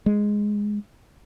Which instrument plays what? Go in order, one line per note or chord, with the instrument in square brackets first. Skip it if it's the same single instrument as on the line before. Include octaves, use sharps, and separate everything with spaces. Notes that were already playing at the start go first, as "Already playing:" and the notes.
[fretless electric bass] G#3